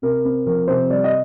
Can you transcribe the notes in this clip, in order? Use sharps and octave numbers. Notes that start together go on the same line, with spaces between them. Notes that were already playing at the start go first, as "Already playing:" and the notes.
C3 A#4
C4
F3 A#4
C3 C5
G3 D5
D#5